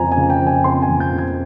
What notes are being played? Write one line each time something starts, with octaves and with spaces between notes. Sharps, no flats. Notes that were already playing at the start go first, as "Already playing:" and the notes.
Already playing: F2 C#3 F3 C4 G#5 A#5
G#5
C#3
G5
F3
G#5
C4 C6
G#5
F2
G6
C#3
G#6